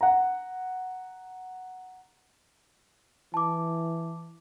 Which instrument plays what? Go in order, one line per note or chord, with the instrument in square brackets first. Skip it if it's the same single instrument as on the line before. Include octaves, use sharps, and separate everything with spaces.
[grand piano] F#5 A#5
[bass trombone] E3 [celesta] A5 D6